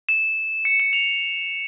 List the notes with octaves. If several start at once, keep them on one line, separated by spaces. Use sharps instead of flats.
E7
C#7
E7
F7